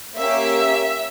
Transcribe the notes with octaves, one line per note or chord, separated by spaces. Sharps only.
A#3 C#4 G4 E5